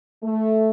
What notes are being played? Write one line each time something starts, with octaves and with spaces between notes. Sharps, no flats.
A3